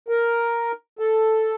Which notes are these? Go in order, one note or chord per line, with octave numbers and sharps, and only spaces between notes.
A#4
A4